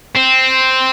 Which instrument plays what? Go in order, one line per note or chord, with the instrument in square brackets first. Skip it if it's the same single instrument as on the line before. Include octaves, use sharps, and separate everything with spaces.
[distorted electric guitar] C4